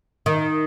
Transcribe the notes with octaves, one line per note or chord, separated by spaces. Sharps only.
D#3